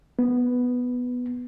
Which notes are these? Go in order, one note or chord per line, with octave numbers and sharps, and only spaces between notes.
B3